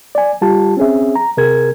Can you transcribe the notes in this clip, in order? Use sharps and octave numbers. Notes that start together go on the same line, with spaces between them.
D5 G#5
G3 F4 G4 A5
C4 C#4 G#4 E5
A#5
C3 G#4 A#4 G#6